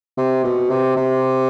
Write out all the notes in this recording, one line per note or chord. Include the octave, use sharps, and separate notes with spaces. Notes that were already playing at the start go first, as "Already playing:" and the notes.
C3
B2
C3
C3